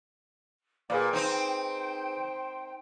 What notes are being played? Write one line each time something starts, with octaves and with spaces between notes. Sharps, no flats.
A#2 A#3 G#4 B4 D5 G5
C4 D#4 C5